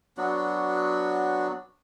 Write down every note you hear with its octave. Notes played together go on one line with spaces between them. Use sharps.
F#3 B3 D4 F#4